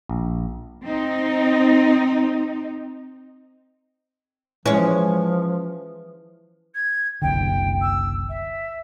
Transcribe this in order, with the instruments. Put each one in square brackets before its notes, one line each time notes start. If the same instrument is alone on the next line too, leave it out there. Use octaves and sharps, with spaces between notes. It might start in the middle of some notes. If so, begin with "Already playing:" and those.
[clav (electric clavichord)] A#1
[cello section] C4 D#4
[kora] E3 [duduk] F3 [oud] G#3 C#4
[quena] G#6
[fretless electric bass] F#1 C2 D3 [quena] G5
[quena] E6
E5